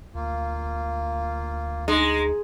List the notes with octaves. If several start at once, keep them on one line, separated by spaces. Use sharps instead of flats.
D2 A#3 F4
G#3 D#4